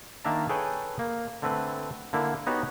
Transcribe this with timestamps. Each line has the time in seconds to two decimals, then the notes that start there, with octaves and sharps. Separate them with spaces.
0.24 D#3 A#3 D4 E5 A5 A#5
0.49 G#4 A4 B4 C#5 G5 G#5
0.99 A#3
1.42 D3 A3 C4 B4
2.13 D3 A#3 E4
2.47 B3 D#4 F#4 G4 C#5